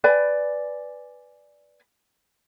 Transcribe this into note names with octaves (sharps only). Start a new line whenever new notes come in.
B4 D5 G#5